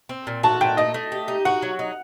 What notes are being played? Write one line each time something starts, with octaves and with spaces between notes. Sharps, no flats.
C4
A#2
F#4 A5
A#2 G5
A3 D#5
A3
G4
D#4
F#4 F#5
F#3
D#4